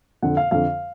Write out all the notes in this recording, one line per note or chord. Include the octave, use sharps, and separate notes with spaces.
F2 D3 F#5
F5
F2 D3 F5